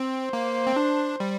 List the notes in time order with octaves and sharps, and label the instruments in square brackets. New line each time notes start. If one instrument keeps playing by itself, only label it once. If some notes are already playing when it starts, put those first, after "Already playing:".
Already playing: [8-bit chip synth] C4 [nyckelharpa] C5
[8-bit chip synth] A#3
C4
D4
G3